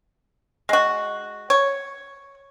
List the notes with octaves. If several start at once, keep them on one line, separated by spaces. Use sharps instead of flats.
G#3 F#4
C#5